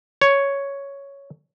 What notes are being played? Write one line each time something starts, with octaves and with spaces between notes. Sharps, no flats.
C#5